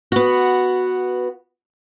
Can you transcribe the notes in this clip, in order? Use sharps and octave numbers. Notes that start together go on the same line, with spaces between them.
B3 F#4